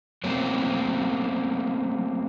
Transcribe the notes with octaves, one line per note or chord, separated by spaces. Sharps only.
F#3 A3 A#3 C4 C#4